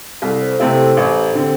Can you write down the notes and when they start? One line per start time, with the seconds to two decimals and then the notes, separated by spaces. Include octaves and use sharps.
0.22 C2 A4
0.41 C5
0.53 C5
0.59 C3 A3 C4 E4 A4
0.78 G4
0.97 A1
1.35 D3 C4